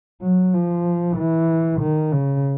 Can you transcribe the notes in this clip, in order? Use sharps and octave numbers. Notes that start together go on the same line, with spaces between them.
F#3
F3
E3
D#3
C#3